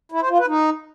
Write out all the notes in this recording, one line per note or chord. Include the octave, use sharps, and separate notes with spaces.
E4
C5
F4
B4
D#4